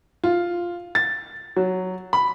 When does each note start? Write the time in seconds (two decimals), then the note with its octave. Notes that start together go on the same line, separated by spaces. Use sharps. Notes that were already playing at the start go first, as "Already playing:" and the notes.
0.24 F4
0.95 A6
1.56 F#3
2.13 B5